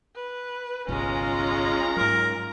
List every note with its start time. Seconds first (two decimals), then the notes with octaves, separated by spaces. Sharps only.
0.15 B4
0.88 G1 C2 G#3 C#4 F4 A#5
1.97 G#2 F#3 A#4